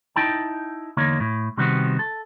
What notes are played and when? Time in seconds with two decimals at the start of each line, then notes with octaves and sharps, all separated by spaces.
0.16 D#4 E4 G5 A5
0.97 E2 D3 A#3 D#4 C#5
1.20 A2
1.57 C3 D#3 G3 B3 C4 F#4
1.99 A4